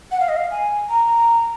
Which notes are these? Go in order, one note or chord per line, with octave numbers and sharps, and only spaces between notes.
F#5
F5
D#5
F5
G#5
A#5